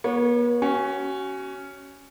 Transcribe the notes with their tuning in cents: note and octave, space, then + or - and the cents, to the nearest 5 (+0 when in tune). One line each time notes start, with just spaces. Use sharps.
B3 -45 C#5 +0
C#4 +0 F#4 +30